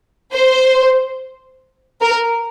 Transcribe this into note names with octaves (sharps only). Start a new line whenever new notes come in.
C5
A#4